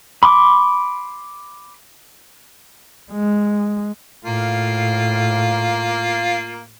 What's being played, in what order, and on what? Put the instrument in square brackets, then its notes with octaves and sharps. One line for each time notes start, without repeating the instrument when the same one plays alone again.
[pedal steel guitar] B5 C6 D6
[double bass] G#3
[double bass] A2 [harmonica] A#3 F4